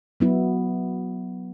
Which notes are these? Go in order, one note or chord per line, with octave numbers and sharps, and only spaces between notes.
F#3 B3 E4